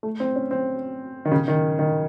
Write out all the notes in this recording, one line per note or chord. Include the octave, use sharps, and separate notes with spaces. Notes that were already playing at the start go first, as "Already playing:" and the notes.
A3
C4
C#4
C4
D#3
C#3
D#3
D#3